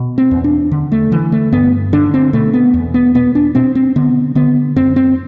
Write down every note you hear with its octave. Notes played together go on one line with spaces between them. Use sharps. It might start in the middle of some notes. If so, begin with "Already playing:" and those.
Already playing: B2
C4
E2
D4
D3
A3
D3 E3
A3
G2 B3
D3 D4
C4
B2 A3
B3
E2
B3
B2 B3
D4
B2 C4
C4
D3 B3
D3 B3
F#2 C4
C4